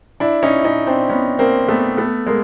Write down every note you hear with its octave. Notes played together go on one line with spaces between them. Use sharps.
D4 E4
C#4 D#4
E4
C#4 D#4
C4 D4
B3 C#4
A#3 C4
A3 B3
A3 B3
G#3 A#3